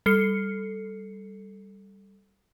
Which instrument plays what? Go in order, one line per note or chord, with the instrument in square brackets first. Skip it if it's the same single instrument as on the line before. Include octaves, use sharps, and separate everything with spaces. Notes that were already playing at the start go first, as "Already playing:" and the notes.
[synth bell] G3 A4 C7 C#7